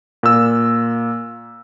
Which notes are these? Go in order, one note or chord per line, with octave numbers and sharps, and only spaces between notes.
A#2 E6